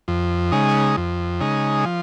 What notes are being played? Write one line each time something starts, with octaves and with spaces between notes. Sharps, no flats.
F2
C#3 G#3 D#4
F2
C#3 G#3 D#4
F3